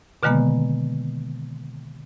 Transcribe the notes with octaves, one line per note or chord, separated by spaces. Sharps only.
B2 D3 D#3 G#3 A#3 B3